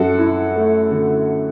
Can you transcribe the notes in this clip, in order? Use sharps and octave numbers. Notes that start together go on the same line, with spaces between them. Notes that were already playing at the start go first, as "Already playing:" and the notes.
Already playing: F#2 F#4 A4
E4
A3
D3